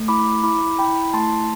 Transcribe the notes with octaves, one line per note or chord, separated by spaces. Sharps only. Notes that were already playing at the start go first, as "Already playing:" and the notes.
Already playing: A3
E4 B5 D6
E4 B5 D6
E4 G5 B5
A3 A5 C6